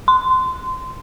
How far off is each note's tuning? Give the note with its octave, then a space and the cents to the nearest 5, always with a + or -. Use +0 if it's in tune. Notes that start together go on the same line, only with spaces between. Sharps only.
C6 -20